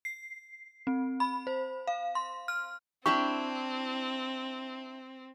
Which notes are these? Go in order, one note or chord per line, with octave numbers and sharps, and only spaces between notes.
C7
C4
B5
C5
F5
C6
F6
C4 D4 E4 G4 C#6